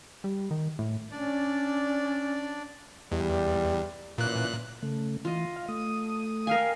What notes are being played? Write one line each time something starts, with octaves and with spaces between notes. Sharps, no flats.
G3
D#3
A2
C#4 D4 D5
E2 G3
F#2 A#2 E3 F#6
C#3 A3
E3 F4 D#5
F5
A3 D#6
A#4 F5 G5 G#5